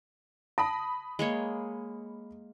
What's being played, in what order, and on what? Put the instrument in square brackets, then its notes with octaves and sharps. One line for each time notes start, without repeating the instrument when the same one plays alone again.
[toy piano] A5 [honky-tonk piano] B5 D#6 A#6
[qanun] G#3 A#3 C#5